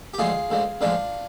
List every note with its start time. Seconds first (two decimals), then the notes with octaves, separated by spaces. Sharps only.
0.14 G4
0.19 D2 D3 F3 G#3 F4 G#4
0.50 D2 D3 F3 G#3
0.81 D2 D3 F3 G#3 D4 F4